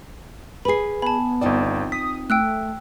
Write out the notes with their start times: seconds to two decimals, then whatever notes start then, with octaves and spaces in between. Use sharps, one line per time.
0.65 G#4 B4 B5 C7
1.02 B3 G#5 A5 B5
1.41 G1 C4 D#4 F4 D5
1.92 D#6 B6
2.30 A3 G5 E6 F#6